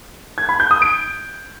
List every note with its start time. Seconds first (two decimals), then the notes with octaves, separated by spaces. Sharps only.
0.38 G#6
0.49 B5
0.60 G6
0.71 D#6
0.82 D7